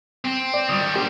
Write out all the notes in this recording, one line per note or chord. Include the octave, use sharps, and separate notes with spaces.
C4
D5
D#3 G3 D#6
A#3 G4 C5